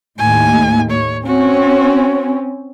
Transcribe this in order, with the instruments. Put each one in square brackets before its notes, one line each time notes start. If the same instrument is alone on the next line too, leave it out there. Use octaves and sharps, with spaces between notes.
[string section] D#2 A2 [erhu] G#5
[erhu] C#5
[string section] C4 C#4 [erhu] F#4